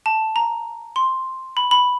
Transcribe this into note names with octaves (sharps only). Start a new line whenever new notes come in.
A5
A#5
C6
B5
B5